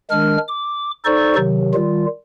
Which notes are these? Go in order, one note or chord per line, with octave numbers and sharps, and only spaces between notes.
D#3 G#3 D4 A#4 F6
D6
D#4 A4 C5 D5 C#6
C3 D#3 F#3
D#3 G3 F4